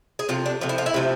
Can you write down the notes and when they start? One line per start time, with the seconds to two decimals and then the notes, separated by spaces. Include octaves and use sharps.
0.19 G#4
0.29 C3 F3 A3 F4
0.46 D4
0.61 C3 F3 A3
0.69 E4
0.78 F4
0.86 E4
0.94 C3 F3 A3